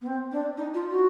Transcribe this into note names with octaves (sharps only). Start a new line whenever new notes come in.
B3
C4
D4
D#4
F4
F#4